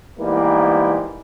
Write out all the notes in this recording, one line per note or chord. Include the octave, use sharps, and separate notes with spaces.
G#2 E3 G3 A#3 B3